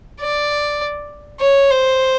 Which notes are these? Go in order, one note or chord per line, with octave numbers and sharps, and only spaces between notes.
D5
C#5
C5